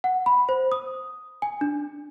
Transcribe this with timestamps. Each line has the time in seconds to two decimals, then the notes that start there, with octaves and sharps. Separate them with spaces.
0.04 F#5
0.26 B5
0.49 C5
0.72 D#6
1.42 G#5
1.61 D4